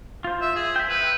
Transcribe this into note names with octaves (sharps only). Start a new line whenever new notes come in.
F4 C5
E5
G#4
E5 G5
B4